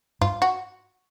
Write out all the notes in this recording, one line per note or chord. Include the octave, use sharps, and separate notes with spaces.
G2 F4
F#4